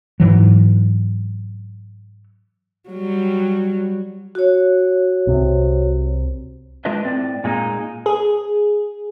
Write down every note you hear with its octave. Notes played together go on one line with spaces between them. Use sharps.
G#2 E3 F#3
F#3 G3
F#4 C#5
C2 C3
G#3 D4 F4 B4 D#5 E5
A2 C4 D5
A#2 G#3 A#3 D#4
G#4